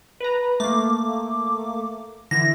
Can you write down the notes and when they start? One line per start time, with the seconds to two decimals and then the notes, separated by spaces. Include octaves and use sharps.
0.20 B4 A#5
0.60 A3 A#3 D6
2.31 D3 E3 E4 A#6